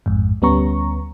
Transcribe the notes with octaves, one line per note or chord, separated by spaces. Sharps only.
A1 F2 G#2
D2 G3 B3 C#4 A#5 C#6